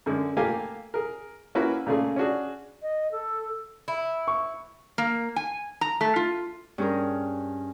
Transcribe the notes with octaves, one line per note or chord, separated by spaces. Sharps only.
F#2 D3 G#3
A3 A#3 F4 G4 F5 G#5
G#4 A#4
A#3 C#4 E4 F#4 B4
A#2 C#3 A3 G#4
C#4 D4 F#4 G#4
D#5
A4
E4
C#6
A#3
G#5
A#5
A3
F4
G2 C#4 G#4 A#4